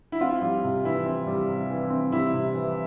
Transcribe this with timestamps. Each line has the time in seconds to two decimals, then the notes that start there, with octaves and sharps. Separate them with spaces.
0.12 E4
0.21 C4 F4
0.42 G3
0.64 C3
0.84 E3 E4
1.06 C4
1.27 G3
1.48 C3
1.70 E3
1.90 C4
2.11 G3 E4
2.34 C3
2.54 E3